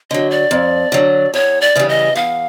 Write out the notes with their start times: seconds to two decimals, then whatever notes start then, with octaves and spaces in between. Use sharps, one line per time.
0.10 D3 F#3 D#5
0.30 D5
0.51 F2
0.92 D3 F#3
1.33 E2 C#5
1.61 D5
1.75 C#3 E3 G3
1.89 D#5
2.16 E2 F5